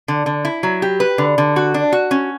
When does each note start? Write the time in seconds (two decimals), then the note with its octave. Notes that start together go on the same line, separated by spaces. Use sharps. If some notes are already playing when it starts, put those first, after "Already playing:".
0.08 D3
0.26 D3
0.45 E4
0.63 F#3
0.82 G4
1.00 B4
1.18 D3
1.38 D3
1.56 F#4
1.74 D4
1.92 F#4
2.11 C#4